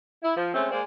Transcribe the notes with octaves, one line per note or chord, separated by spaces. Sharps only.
E4
F3
G#3 A3 C4 C#4
G#3 A#3 C5 D5